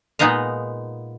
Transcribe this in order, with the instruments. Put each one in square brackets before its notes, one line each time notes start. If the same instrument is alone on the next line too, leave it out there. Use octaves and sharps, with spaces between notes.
[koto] A#2 G#3 B3 D#4 D#5 F5